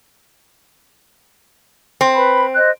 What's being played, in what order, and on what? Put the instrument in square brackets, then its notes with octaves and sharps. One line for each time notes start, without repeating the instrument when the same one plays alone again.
[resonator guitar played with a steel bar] C4
[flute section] B4 B5
C5 D#5 F#6